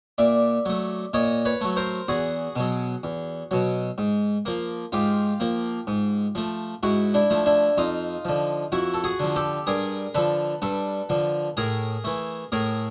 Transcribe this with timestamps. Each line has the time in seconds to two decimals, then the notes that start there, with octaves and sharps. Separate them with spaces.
0.18 A#2 D5 E5
0.66 F#3 A3
1.13 A#2 C#5 D#5
1.45 B4 C#5
1.61 F#3 A3
1.77 A#4 C5
2.08 E2 F#4 G#4
2.56 B2 F#3
3.03 E2
3.51 B2 F#3
3.98 G#2
4.45 F3 A#3
4.92 G#2 F4 G4
5.40 F3 A#3
5.87 G#2
6.35 F3 A3
6.83 G#2 E4 F#4
7.14 D4 E4
7.30 F3 A3
7.46 D4 E4
7.78 F2 D#4 F4
8.25 D3 F3
8.72 F2 E4 F#4
8.94 A4
9.04 F#4 G#4
9.20 D3 F3
9.36 G4 A4
9.67 G2 G#4 A#4
10.14 D3 F3 A4 B4
10.62 G2 A4 B4
11.09 D3 F3
11.57 A2 G#4 A#4
12.04 E3 A3
12.52 A2 G#4 A#4